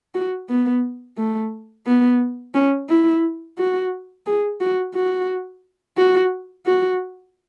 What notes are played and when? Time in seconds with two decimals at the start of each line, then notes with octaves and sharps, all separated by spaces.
0.15 F#4
0.49 B3
1.18 A3
1.86 B3
2.54 C#4
2.89 E4
3.58 F#4
4.26 G#4
4.61 F#4
4.95 F#4
5.98 F#4
6.66 F#4